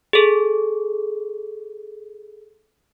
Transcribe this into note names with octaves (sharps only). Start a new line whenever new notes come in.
G#4 A4